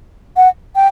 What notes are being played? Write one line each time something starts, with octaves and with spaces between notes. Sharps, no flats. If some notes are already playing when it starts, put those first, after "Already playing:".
F#5
G5